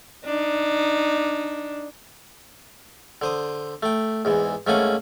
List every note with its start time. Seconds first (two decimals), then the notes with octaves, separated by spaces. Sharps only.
0.25 D4 D#4
3.22 D3 C5 D#6
3.83 A3 G5
4.25 E2 G#2 E3
4.67 G#2 A3 A#3 C#4 F#5 G#5